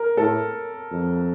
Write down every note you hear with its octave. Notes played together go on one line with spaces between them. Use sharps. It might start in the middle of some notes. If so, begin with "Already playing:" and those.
Already playing: A#4
A2 A4
F2